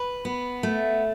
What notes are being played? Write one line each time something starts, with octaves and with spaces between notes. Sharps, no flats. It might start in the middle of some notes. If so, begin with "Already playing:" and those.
Already playing: B4
B3
A3